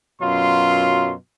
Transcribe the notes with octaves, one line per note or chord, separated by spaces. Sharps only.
F#2 B2 F#3 F4 C6